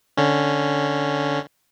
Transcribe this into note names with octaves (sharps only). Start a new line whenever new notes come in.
D3 C#4